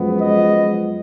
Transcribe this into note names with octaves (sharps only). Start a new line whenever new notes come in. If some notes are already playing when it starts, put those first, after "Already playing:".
Already playing: F#2 F3 G#3 B3
D#5